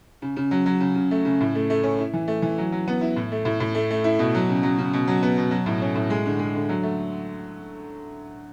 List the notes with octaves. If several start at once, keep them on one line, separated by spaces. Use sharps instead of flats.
C#3
C#3
F#3
F#3
C#3
C#3
A3
C#3
A2
A3
A3
C#4
E4
E3
A3
E3
F#3
F#3
B3
E4
A2
A3
A2
A2
A3
A3
E4
B2
F#3
C#3
F#3
C#3
B2
F#3
B3
B2
F#3
A2
C#4
A2
G#3
D3
G#3
D3
F#3
A3